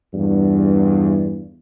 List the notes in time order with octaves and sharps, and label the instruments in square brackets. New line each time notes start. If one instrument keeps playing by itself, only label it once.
[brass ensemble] E2 G2